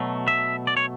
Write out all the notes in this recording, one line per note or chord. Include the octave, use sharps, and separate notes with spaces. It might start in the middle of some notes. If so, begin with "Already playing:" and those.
Already playing: B2 F#3 A3
E5
D5
C#5